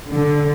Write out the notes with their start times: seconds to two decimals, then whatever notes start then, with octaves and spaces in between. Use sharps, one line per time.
0.11 D3